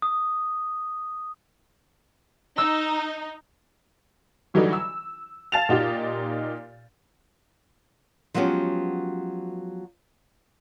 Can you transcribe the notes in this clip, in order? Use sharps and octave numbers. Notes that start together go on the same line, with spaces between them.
D#6
D#4 E6
D3 E3 F#3 G3 A3 D#4
E6
F5 A5 A6 E7 F7
A#2 D#4 F4 G4
F3 F#3 G#3 B3 C#4 G4